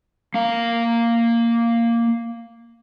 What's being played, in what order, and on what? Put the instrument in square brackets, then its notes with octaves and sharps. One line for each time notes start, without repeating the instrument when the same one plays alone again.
[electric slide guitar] A#3 F5